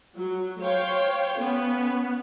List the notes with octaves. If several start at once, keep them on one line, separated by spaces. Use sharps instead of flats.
F#3
C5 C#5 F5 G5
B3 C#4